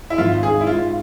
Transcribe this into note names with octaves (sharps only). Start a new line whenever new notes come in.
E4
G#1 F4
G#2 G#4
E4
G#2 F4